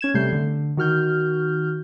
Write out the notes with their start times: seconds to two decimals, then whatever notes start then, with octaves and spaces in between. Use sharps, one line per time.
0.01 C#4 G#6 E7
0.14 C3 G3 A3 G6 C7
0.32 D3
0.77 D#3 F#4 F6 G6